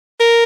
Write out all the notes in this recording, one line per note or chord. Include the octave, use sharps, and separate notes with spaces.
A#4